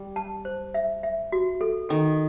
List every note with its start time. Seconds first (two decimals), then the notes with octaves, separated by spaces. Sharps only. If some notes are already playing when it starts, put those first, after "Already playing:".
Already playing: G3
0.16 A5
0.45 C5
0.74 E5
1.03 E5
1.32 F#4
1.61 A4
1.89 D#3 A4